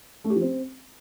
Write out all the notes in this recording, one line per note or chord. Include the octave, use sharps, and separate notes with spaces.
A3
G4
F3
C4